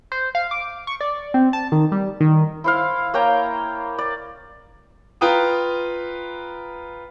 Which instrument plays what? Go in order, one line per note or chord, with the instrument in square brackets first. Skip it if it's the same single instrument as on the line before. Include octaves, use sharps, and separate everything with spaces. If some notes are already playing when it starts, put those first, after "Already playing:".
[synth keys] C5
F5
D6
C#6
D5
C4
A5
D#3
G3
D#3
[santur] E4 C5 F5
A#3 C#5 G5 A#5
D5
[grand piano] F4 B4 G5 A#5 D#6